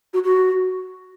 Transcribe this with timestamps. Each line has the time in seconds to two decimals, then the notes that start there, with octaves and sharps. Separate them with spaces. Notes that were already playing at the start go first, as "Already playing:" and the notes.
0.14 F#4
0.24 F#4